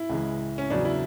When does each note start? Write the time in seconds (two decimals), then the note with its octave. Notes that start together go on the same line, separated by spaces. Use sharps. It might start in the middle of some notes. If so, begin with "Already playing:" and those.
Already playing: E4
0.09 C#2 C#3 E3 G#3
0.58 C#4
0.70 E2 C#3 F#3 D4
0.85 E4